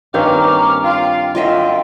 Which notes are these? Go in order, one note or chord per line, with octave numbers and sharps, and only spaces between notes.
G2 D#3 A#3 C4 C#4 A#5 D6 F6
F4 G5
F#2 F4 D#5 E5